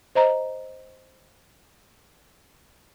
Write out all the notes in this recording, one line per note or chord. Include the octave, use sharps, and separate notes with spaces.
C5 D#5 A#5